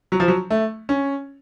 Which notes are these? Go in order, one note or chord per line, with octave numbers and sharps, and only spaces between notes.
F#3
F3
F#3
A3
C#4